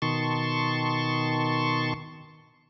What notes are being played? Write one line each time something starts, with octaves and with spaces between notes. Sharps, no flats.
B2 D#3 A5 C6 C#6